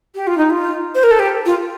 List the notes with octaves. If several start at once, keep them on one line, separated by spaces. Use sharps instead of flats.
G4
F4
D#4
F4
C5
A#4
A4
G4
F4